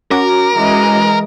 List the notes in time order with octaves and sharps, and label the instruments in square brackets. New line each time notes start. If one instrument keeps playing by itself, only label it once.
[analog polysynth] C#4 F#4 D6 [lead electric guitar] A#4
[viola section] E3 G#3 D#5